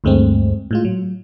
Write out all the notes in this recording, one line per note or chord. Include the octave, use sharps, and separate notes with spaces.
D2 G2 G#3 A3 C4
A2 G#3 F4
F#3